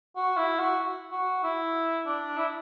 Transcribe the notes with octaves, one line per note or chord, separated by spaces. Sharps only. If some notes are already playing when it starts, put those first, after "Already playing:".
F#4
E4
F#4
F#4
E4
D4
E4